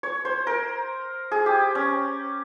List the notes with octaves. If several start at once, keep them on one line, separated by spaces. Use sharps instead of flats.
C#5
C5
A#4
G#4
G4
C#4